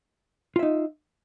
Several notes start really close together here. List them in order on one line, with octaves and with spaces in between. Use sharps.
F4 E5 D#4